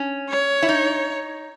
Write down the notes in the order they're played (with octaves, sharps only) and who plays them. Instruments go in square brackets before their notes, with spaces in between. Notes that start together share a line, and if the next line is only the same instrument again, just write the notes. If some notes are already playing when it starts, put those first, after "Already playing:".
Already playing: [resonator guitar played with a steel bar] C#4
[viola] C#5
[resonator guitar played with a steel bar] E4
D#4